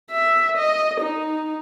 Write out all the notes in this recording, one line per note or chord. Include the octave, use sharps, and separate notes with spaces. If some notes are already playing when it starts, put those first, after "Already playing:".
E5
D#5
D#4